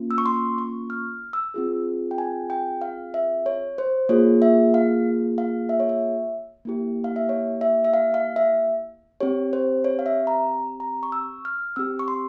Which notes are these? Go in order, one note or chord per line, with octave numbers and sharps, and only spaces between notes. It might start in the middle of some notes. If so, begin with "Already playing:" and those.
Already playing: A#3 C#4 F4
E6
C#6
C6
C#6
F6
E6
C4 F4 G#4
G5
G#5
G5
F5
E5
C#5
C5
A#3 F4 G#4 C#5
E5
F5
F5
E5
C#5
E5
A#3 E4 G4
F5
E5
C#5
E5
E5
F5
F5
E5
C4 G4 C#5
C5
C#5
F5
E5
A#5
A#5
C#6
E6
F6
C4 G4 E6
C#6
C6